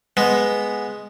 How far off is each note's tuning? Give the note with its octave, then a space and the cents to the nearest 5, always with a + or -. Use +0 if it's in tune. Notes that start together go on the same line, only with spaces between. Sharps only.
G#3 +0 B3 +0